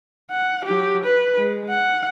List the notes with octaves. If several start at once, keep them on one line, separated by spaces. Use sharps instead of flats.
F#5
F#3 G4
B4
G#3
F#5